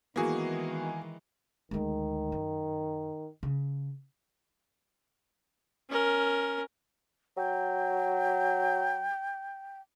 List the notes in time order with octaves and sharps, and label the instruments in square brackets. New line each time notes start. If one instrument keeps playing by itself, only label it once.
[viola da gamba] D#3 E3 G#3 [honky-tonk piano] A#3 G#4 [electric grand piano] B3 E4 F#4
[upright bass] D2 G#3 [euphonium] D#3
[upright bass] F#2
C#3
[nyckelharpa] C#4 A#4
[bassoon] F#3 [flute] G5